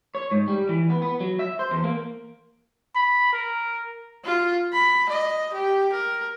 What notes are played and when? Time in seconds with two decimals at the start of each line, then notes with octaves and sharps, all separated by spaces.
0.15 C#5
0.31 G#2
0.48 G3
0.69 E3
0.90 B3
1.02 B3
1.20 F#3
1.39 E5
1.59 C5
1.71 E2
1.84 A#3
2.95 B5
3.33 A#4
4.25 F4
4.73 B5
5.09 D#5
5.53 G4
5.92 A#4